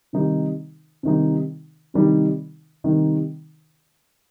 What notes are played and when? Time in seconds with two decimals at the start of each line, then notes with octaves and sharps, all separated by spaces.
0.13 C3 D#3 G3 D#4
1.03 C3 D#3 G3 D#4
1.94 C3 D#3 G3 D#4
2.84 C3 D#3 G3 D#4